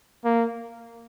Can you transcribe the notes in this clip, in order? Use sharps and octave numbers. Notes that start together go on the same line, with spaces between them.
A#3